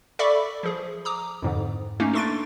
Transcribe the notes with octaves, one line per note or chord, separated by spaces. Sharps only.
A4 D5 E5 B5 C#6 D6
F3 G#4
A#5 D6 D#6
F2 G#2 D3
A3 A#3 C#4 D#4
D4 A4 C6 C#6 A6 D7